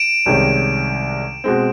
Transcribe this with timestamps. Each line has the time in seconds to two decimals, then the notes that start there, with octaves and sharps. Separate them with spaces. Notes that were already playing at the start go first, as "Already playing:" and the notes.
Already playing: D7 E7
0.26 C2 C3 D#3 G#3 C#4
1.44 B2 G#3 C4